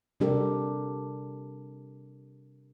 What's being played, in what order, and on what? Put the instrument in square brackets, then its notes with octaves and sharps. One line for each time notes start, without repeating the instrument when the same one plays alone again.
[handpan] C3 G3 D4 G4 A4 A#4